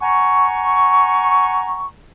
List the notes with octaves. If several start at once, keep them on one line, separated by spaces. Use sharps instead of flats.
F#5 G#5 A#5 C#6